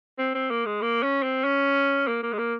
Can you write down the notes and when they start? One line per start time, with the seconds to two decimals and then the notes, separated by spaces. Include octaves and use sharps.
0.19 C4
0.35 C4
0.50 A#3
0.65 G#3
0.82 A#3
1.03 C#4
1.23 C4
1.44 C#4
2.07 A#3
2.23 A#3
2.33 G#3
2.38 A#3